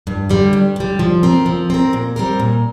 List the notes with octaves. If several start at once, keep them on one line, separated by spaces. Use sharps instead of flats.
G2
D3 G3
G2
D3 G3
F3
C4 A#4
F3
C4 A#4
A#2
G3 C4 A#4
A#2